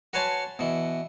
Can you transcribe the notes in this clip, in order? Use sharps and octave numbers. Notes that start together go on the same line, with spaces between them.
F#4 B4 C#5 G#5 A5 C6
B2 E3